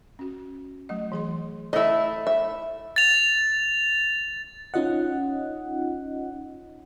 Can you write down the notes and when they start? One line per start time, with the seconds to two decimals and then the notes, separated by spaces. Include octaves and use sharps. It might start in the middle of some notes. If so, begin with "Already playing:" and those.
0.19 C#4 F#4
0.89 F#3 A3 D#5
1.12 E3 G#4 C6
1.73 A3 E4 D#5 E5
2.27 E5
2.96 A6 F7
4.74 C#4 D#4 F4 D#5 F#5